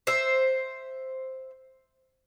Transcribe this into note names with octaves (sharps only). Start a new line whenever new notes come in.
C5 E5